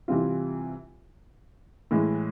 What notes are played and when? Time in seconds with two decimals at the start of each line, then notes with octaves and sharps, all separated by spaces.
0.08 C3 E3 G3 C4 F4
1.91 A2 E3 G#3